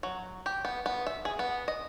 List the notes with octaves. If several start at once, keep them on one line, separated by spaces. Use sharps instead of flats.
F#3
G4
B3
B3
E5
G#4
B3
D#5